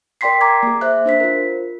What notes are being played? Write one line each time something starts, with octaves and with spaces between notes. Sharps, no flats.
A#4 D5 G5 C6 B6 C7
A#5 D6 G#6
A#3 G#4
C5 E5 F#6
D4 C5 B6
F4 A#4